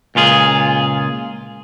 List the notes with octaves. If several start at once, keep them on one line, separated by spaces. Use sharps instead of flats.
C#2 A#2 F4 G#4